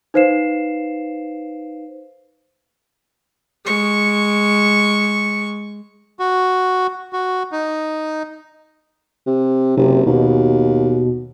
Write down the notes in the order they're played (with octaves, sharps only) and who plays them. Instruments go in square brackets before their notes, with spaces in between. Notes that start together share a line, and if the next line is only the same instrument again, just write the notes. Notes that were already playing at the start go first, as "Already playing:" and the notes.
[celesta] D#4 B4 C5 F5 C7 E7
[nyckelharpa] G#3 C#6
[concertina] F#4
F#4
D#4
[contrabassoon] C3
[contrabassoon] F#1 [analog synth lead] C3
[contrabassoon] D#2 [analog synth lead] B2